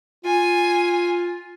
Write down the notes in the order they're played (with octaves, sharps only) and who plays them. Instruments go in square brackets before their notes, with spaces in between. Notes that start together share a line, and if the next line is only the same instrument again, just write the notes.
[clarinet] F4 [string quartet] G#5